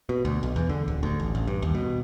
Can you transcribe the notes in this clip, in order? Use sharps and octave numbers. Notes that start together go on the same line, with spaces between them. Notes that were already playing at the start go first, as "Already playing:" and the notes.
B2
D2
B1
E2
D3
D1
D2
A1
A1
G2
D#2
B2